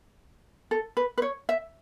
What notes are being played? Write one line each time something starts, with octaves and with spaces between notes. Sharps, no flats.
A4
B4
B4
C#5
E5